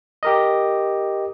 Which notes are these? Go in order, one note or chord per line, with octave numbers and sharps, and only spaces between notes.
G4 A#4 D#5